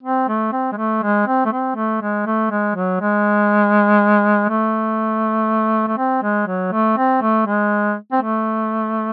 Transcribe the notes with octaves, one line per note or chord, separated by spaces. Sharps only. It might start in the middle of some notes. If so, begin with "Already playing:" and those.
C4
A3
C4
G#3
A3
G#3
C4
A3
C4
A3
G#3
A3
G#3
F#3
G#3
A3
A3
C4
G#3
F#3
A3
C4
A3
G#3
C4
A3